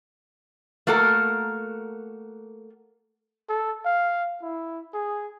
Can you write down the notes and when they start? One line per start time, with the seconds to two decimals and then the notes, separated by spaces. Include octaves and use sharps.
0.87 A3 A#3 F#4 A4 A#4
3.49 A4
3.85 F5
4.42 E4
4.94 G#4